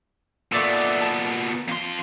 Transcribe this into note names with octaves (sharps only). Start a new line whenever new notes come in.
A#2 A3 B3 D5 E6
A5
F2 C6